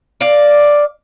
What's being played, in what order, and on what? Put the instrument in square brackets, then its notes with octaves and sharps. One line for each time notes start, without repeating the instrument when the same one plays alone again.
[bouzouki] D5 F5